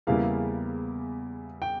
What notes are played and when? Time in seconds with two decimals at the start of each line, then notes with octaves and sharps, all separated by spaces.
0.07 E2 C#3 G3 A#3 E4 F5
1.62 G5